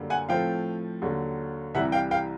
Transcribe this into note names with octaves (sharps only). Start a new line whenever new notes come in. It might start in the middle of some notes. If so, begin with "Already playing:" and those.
Already playing: F#2 D3 G3 A#3
F#5 G#5
A2 F3 A3 C4 F5 G5
D#2 D3 F#3
C2 C3 E3 G3 E5 F#5
F5 G5
F5 G5